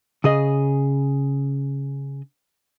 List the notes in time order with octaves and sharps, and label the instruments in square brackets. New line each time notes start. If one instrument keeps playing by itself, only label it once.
[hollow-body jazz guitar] C#3 G#4 D#5